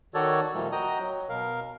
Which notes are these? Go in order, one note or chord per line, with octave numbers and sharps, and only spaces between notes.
D#3 F#4 A4 C#5 D5
A#2 D#3 F3 G3 A3
F#4 D#5 G5 A#5 D#6
F#3
B2 A#4 F5